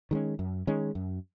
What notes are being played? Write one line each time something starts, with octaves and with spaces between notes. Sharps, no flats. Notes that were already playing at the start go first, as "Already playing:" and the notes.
D#3 G#3 C#4
F#2
D#3 G#3 C#4
F#2